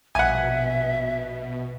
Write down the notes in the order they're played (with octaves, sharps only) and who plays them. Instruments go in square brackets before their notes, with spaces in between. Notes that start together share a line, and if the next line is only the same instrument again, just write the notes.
[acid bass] A#1 [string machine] B2 [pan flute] E5 [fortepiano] F#5 G#5